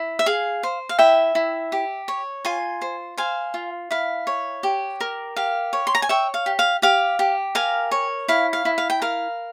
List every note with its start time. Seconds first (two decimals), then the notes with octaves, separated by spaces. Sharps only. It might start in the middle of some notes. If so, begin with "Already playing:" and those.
Already playing: E4
0.19 E5
0.26 G#4 F5
0.63 C5
0.89 F5
0.99 E4 E5 G5
1.35 E4
1.72 G4
2.08 C#5
2.45 F4 G#5 C6
2.82 C5
3.18 C5 F5 G#5
3.54 F4
3.91 E4 F5
4.27 C#5
4.63 G4
5.01 A#4
5.37 G4 F5
5.73 C#5
5.87 C6
5.95 A#5
6.02 G#5
6.09 C#5 E5 G5
6.34 F5
6.46 G4
6.59 F5
6.82 G4 F5
7.19 G4
7.55 A#4 F5 G#5
7.91 C#5
8.28 E4 F5
8.53 F5
8.65 E4
8.78 F5
8.90 G5
9.02 A#4 F5